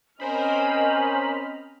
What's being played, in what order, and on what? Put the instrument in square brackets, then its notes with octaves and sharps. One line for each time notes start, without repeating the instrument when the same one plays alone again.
[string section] C4 D#5 F6 [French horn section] C#4 [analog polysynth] A#4 C5 B5 [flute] G#5